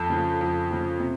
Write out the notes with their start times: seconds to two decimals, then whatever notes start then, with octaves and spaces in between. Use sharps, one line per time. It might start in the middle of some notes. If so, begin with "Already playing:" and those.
Already playing: F2 A4
0.10 C#3 F3
0.41 F2
0.71 C#3 F3
1.00 C3